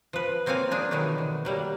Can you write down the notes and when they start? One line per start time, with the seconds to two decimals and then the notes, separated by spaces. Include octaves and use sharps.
0.13 F3 B4
0.46 A#3 C4 C#5 F5 G#5
0.71 F3 D4 G#4
0.91 B2 D#3 E3 F#3 A3
1.18 D3
1.45 F#3 G3 A#3